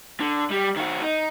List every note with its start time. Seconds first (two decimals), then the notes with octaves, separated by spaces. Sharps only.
0.20 D3
0.50 G3
0.76 D#3 F#4
1.01 D#4